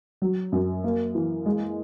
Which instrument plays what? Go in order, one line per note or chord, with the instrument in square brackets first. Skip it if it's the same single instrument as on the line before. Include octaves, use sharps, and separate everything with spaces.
[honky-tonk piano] F#3
F#2
A#3
E3
G#3